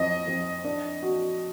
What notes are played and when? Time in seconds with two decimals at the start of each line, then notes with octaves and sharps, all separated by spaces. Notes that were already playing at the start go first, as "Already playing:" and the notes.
Already playing: F2 D#5
0.27 F2
0.64 D4
1.02 F#4